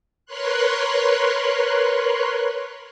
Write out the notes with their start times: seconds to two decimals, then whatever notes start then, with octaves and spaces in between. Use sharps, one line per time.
0.26 A#4 B4 C#5 C6 F#6